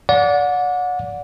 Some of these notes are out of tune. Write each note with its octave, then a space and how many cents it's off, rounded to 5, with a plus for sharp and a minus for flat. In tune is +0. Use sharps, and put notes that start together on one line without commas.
D5 -25 F#5 -30